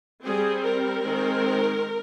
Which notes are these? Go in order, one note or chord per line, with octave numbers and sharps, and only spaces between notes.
G3 C4 G#4
A#4
D#3 G#3 C4